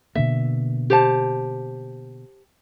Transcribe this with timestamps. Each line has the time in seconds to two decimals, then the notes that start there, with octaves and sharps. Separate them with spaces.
0.15 B2 D3 A#3 E5
0.90 G4 C5 A5